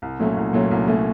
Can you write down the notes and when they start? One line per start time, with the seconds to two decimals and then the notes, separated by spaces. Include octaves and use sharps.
0.02 C2
0.20 A#2 F#3 A3 C#4
0.36 C2
0.53 A#2 F#3 A3 C#4
0.71 C2
0.87 A#2 F#3 A3 C#4